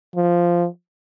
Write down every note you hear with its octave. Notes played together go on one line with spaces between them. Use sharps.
F3